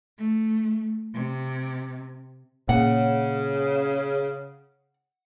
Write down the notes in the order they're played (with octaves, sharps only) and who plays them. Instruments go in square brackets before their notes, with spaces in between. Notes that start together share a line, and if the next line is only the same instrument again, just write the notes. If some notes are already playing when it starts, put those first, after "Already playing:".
[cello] A3
C3
[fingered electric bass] A#2 [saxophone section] C#3 [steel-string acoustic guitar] F#5